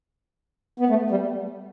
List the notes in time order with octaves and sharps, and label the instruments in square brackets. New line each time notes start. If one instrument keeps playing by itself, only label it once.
[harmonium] B3
A3
G3